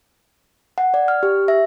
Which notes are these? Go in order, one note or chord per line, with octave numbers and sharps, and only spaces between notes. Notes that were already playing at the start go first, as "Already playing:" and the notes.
F#5
D5
F6
G4
E5